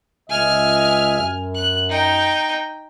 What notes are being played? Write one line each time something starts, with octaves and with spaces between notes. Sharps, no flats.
C#2 D#5 E5 G#5 F6
F#2
F#6
D#4 G5